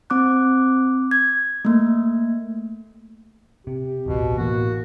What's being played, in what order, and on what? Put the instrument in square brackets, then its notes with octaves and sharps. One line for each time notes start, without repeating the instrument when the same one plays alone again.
[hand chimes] C4 D6 F#6
G#6
A3 A#3
[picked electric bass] C3 [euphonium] G4
[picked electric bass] D1 A1 E2 [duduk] B2
[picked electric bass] A2 E3 B3 [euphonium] A#3 [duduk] F#4